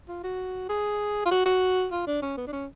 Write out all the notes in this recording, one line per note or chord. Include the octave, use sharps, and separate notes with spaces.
F4
F#4
G#4
F4
F#4
F#4
F4
D4
C#4
B3
D4
C#4